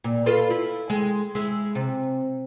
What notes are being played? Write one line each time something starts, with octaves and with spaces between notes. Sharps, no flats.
A#2
F4 A4 B4
E4
G#3
G#3 E4
C3